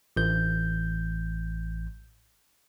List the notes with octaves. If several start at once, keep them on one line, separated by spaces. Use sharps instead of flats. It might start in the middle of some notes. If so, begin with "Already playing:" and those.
A1 G6